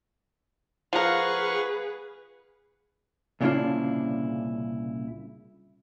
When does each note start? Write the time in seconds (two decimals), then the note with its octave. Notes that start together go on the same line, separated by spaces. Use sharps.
0.93 F3 G#4 A#4 B4 F5 F#5 C#6
3.41 C2 A#2 C#3 D4 E4 F4